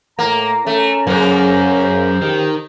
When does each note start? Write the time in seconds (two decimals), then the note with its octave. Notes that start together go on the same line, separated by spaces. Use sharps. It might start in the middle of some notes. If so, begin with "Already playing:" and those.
0.19 A2 A#3 A#5
0.67 A3 C#4
1.07 F#2 C#3 A#3 C5
1.83 C5
2.22 D#3 G4